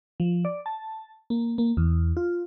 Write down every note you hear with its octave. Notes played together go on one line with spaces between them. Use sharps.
F3
D5
A5
A#3
A#3
E2
F4